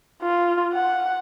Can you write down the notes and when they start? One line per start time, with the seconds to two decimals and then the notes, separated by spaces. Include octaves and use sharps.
0.22 F4
0.73 F#5